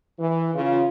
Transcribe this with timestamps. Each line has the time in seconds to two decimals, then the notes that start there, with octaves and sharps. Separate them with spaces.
0.18 E3
0.54 C#3 F4